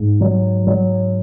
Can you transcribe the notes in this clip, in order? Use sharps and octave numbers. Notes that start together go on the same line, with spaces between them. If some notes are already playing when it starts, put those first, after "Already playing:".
Already playing: G#2
F#3
F#3